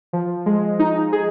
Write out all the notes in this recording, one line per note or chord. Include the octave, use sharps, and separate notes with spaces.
F3
G#3
D#4
G#4